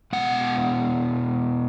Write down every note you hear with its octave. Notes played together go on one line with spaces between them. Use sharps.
B2 G#3 F#5